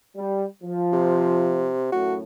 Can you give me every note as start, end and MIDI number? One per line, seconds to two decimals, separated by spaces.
0.17 0.45 55
0.62 1.72 53
0.93 1.91 48
1.92 2.21 42
1.92 2.21 45
1.92 2.15 66